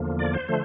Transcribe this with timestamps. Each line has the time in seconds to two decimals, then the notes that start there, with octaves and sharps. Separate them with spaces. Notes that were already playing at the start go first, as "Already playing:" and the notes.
Already playing: E2 D3 F3 A#3
0.19 D5
0.34 C5
0.48 D3 F3 A3